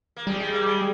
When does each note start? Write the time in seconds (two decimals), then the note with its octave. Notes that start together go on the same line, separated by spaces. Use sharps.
0.16 A#3
0.27 G3 G#3
0.40 G#3
0.53 A#3
0.66 G#3